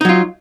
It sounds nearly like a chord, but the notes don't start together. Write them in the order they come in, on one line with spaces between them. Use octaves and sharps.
D#4 F#3 F4